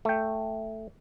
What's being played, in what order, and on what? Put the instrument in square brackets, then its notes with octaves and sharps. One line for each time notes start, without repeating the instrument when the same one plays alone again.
[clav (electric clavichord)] A3 G5